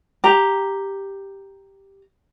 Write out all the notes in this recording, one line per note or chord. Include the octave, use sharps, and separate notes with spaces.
G4 A#5